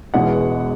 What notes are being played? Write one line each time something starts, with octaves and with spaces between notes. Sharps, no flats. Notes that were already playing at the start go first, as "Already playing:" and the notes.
E1 E2 B2 G#3 F#5